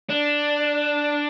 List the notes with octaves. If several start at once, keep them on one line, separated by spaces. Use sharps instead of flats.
D4